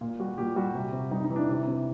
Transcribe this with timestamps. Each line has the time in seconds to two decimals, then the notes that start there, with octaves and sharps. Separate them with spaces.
0.01 A#2 F4
0.20 G3 F#4
0.38 A#2 G4
0.56 G3 F#4
0.75 C3
0.93 C3
1.11 G3 D#4
1.24 D#4
1.31 E3
1.36 D4
1.49 C3
1.68 C3